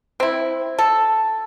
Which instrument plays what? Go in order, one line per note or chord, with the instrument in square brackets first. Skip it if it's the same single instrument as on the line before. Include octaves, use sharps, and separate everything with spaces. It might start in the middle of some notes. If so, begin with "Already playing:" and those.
[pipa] C4 E4
A4